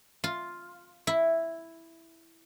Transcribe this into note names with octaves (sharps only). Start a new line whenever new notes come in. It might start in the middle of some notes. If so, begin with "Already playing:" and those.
F4
E4